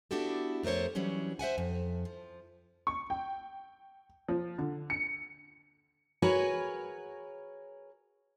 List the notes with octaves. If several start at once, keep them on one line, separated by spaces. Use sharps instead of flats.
B3 D4 E4 F#4 G4 A4
F2 A3 A#4 C5 C#5
E3 F#3 G3 C#4 D4
C5 E5 F#5 G#5
F2
F3
C#6
G5
F3
D3
C#7
F#4 G#4 A#4 B4 C#5 G#5